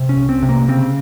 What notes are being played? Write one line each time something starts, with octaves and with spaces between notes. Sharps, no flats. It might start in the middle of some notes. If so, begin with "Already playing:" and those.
Already playing: C3
C#4
C2
C4
C3
A#3
C#3 C4